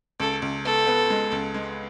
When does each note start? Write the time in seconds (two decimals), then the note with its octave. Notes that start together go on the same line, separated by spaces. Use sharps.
0.20 C#2 A4
0.42 C#2
0.65 B3 A4
0.87 B3
1.10 G#3
1.32 C#2
1.54 G#3